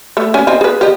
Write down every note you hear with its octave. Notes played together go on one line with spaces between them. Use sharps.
A3
C#4 G#5
D#3 C4 G#5
G#4 B4
G4 D#5